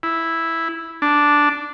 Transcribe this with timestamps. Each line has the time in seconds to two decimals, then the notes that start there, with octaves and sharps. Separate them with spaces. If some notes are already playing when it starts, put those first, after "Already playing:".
0.03 E4
1.02 D4